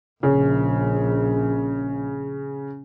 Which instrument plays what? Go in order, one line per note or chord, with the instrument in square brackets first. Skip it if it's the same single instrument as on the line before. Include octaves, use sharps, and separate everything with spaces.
[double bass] A#1 [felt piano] C#3